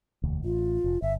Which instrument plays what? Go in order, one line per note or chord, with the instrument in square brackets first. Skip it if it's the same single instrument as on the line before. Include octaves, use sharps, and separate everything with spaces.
[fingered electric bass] E1 D2
[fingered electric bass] A1 [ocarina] F4
[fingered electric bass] F1
[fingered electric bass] G1 [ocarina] E5